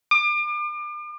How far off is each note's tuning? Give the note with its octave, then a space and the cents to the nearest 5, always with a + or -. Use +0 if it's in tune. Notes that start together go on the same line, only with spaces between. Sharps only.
D6 +35